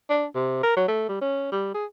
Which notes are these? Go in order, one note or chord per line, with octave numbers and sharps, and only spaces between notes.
D4
C3
A#4
F#3
A3
G3
C#4
G3
G#4